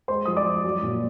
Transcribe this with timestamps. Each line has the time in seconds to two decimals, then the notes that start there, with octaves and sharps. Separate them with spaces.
0.08 G#3 C5 C6
0.25 F3 D#6
0.37 D5 D6
0.45 F3
0.64 F#3
0.83 A#2